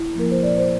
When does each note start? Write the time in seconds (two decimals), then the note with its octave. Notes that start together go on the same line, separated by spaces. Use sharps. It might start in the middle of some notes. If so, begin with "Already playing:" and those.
Already playing: E4
0.15 F3 A#3 A#4
0.31 C5
0.43 A#2 D5
0.58 C5